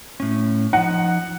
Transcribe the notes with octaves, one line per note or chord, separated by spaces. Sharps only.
A2 C#4
F3 D#4 F#5